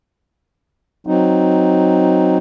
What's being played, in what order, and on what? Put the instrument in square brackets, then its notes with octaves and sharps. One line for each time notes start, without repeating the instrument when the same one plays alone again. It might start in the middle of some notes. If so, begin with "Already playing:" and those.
[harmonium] F#3 C4 D#4